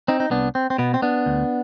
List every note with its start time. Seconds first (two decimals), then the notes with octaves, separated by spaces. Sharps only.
0.08 C4 D#4
0.20 D#4
0.31 C2 B3 D4
0.55 C4
0.70 C4
0.78 B2 B3
0.94 C4
1.02 B3 D4
1.26 D2